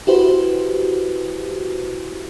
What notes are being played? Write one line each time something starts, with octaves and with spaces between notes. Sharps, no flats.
E4 F#4 G4 B4 C5